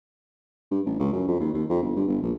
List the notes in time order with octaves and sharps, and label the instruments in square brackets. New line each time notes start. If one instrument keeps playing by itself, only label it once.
[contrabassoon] G2
A1
C#2
F#2
F2
D#2
D#2
F2
G1
G2
G1
A#1